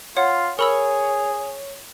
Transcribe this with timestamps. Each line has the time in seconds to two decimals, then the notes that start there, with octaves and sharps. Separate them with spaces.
0.17 F4 C#5 F#5
0.59 G#4 A#4 C#5 B5 E6